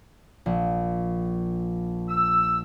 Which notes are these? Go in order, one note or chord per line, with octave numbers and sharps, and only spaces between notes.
A#1
E6